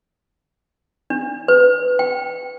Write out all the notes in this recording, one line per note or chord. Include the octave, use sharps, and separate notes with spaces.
D4
B4
G5